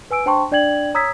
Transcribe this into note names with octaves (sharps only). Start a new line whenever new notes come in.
B4 G#5 E6 D7
D4 C5 G5 A5 C6 C#6
D4 D5 G5 G#6 F#7
C#5 A#5 D#6 E6 G#6 B6